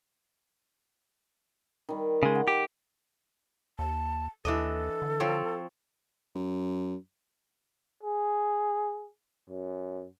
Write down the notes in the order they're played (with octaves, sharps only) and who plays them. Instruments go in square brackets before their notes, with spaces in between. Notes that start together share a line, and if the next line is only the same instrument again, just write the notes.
[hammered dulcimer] D#3 G3
[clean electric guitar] C#3 G#3
[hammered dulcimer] F#5
[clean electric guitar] G4
[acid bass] D#2 [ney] A5
[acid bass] D#2 [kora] E3 D4 D#5 [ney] A4
[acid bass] D3
[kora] F3 C4 C#5
[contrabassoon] F#2
[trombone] G#4
F#2